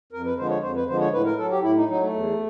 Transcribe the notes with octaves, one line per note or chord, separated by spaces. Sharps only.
F2 A#4
B4
D3 F3 G#3 C5
C#5
F2 C5
B4
D3 F3 G#3 C5
C#5
A2 B4
A#4
F#3 A4
G4
A2 E4
D#4
F#3 D#4
A3
E2